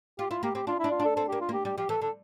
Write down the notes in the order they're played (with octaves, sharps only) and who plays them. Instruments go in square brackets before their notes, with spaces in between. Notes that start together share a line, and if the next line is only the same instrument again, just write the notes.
[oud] F4 [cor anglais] G4
[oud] E4 [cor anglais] F4
[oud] A#3 [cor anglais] G4
[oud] C4 [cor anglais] G4
[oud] D4 [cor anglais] F4
[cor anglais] E4
[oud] D4
[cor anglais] F4
[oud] D4
[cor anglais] A4
[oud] C4 [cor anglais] A4
[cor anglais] G4
[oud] A#3
[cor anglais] F4
[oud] A#3
[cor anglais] G4
[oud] G3 [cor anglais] G4
[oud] F3 [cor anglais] G4
[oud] E3 [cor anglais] A4
[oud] D3 [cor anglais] A4